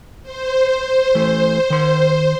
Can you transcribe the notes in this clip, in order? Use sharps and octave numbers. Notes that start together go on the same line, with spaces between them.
C5
E3 A3
D#3 C6